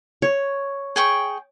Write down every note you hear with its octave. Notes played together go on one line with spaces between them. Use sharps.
C#5
G#4 G5 C#6